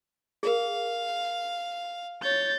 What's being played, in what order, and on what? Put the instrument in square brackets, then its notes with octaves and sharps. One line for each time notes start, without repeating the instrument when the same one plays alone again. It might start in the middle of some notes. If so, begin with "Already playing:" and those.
[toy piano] G#4 A#4 [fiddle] F5
[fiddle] C#5 [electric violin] G6 A6